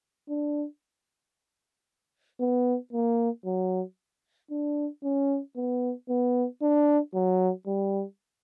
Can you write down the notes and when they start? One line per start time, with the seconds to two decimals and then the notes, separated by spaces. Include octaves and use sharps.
0.29 D4
2.40 B3
2.93 A#3
3.45 F#3
4.51 D4
5.03 C#4
5.56 B3
6.09 B3
6.62 D4
7.14 F#3
7.67 G3